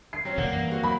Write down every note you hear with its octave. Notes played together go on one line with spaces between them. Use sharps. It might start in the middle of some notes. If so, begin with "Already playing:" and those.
C7
F#3 C4 C#4
F#2 B2 D3 A#3 D5 F#5
G2 E3
C4 F#4
F#3 B5